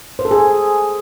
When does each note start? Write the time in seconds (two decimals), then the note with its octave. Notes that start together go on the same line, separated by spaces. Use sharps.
0.19 C5
0.25 A4
0.31 G#4